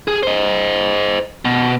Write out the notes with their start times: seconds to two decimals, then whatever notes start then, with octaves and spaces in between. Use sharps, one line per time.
0.08 G#4
0.23 C5 D#5
1.45 B2